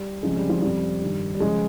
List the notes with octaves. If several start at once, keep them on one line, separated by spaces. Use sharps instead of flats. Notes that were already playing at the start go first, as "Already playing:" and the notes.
Already playing: G3
C#2 C3 F3 G#3
G3
F3
F2 C3 F3 G3
G2 D#3
G3
C#3 F3 G#3